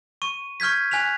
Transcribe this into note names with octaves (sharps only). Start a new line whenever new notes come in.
C#6 D#7
C#6 F6 G6 G#6 B6
G#5 F#6 B6 F7